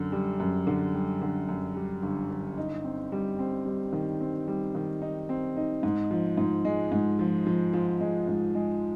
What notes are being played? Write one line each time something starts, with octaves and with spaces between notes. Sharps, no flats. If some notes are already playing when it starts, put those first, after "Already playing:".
Already playing: F#2 D3
G3
F#2
D3
G3
D3
F#2
G3
G1
G1
D#4
C4
G3
C4
G3
D#3
C4
G3
D#3
D#4
C4
D#4
G#2
F3
G#2
G#3
G#2
F3
F3
F3
G#3
G#2
G#3